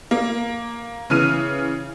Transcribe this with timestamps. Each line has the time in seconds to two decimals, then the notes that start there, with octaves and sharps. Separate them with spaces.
0.11 A#3
1.10 C#3 E3 F6 D#7